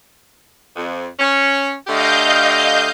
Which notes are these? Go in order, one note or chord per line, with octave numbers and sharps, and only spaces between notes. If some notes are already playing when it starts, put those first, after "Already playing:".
F2
C#4
D3 A3 G4 D#5 F5 G6